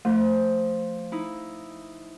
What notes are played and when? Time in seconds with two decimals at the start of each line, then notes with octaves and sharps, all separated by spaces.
0.05 F3 A3
1.12 D#4 E4